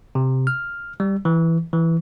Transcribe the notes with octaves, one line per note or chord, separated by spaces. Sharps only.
C3
F6
G3
E3
E3